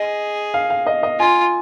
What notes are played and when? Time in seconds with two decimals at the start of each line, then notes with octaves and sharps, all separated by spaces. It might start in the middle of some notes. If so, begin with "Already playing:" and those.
Already playing: G#4 D#5
0.54 F5
0.70 F5
0.87 D#5
1.03 D#5
1.19 F4 G#5